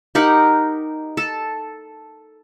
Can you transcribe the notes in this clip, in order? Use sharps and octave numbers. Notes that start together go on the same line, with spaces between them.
D#4 G4 A#4 F#5
A4